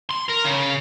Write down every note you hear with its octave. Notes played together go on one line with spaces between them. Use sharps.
C6
A#4
C#3